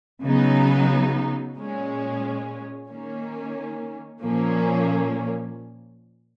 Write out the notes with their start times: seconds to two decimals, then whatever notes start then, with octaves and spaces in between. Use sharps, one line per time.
0.25 C#3 F#3 B3 D#4
1.57 A#2 G#3 C#4
2.90 D#3 A#3 C#4
4.22 A#2 F3 A#3 C#4